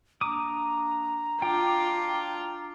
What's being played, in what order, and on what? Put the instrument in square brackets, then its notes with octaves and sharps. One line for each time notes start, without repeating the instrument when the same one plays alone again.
[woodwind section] A#3 D4 [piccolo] A#5 [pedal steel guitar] D6 D#6
[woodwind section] D4 D6 [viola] F4 [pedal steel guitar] G5